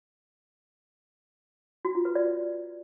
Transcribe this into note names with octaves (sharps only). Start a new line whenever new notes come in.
F#4
F4
B4
D5